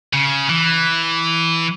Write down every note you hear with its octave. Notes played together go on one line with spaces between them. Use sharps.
C#3
E3